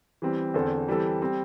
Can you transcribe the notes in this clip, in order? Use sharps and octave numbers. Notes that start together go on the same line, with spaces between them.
E3 G3 C4
E2 D3 C4 A4 C5
E3 G3 C4 A4
G3 C4